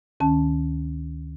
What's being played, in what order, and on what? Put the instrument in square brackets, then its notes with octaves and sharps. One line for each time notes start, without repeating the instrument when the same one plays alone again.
[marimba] D2 D#3 C#4 A5